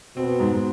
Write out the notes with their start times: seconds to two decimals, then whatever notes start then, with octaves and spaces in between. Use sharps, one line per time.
0.17 B2 B3 C4
0.40 G#2